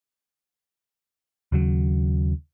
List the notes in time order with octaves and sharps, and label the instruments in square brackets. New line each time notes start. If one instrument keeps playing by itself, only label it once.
[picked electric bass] D#2 C#3 F#3